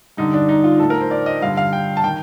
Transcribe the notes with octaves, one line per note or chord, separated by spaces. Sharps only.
G2 D3 D#4
D4
D#4
F4
A2 A4
A#4
C5
D5
D#5
G2 D3 F5
F5
G5
A5
D#3 G5